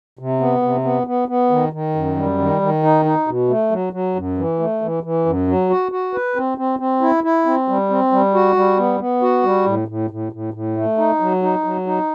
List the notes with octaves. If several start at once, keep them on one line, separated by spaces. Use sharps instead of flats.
C3
B3
C3
B3
B3
B3
D#3
D#3
F#2
G3
D#3
D#3
D#4
D#4
B2
A3
F#3
F#3
F#2
E3
A3
E3
E3
F#2
F#3
F#4
F#4
B4
C4
C4
C4
E4
E4
C4
G3
C4
G3
F#4
G3
B3
B3
F#4
G3
A2
A2
A2
A2
A2
A3
D#4
F#3
D#4
F#3
D#4